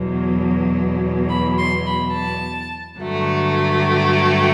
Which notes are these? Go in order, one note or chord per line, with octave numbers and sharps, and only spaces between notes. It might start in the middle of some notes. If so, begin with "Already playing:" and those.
Already playing: E2 B2 F#3
B5
C6
B5
A5
G2 D3 F#3 A3
G5